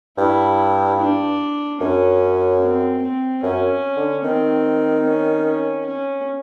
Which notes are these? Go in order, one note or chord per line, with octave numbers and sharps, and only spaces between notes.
G2 E4
D4
F#2 C#4
C4
C4
F#2 C#4
D3
D#3 C4
C#4
C#4
C#4